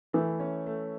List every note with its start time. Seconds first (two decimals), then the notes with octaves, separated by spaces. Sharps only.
0.13 E3 A3
0.40 C#4
0.66 A3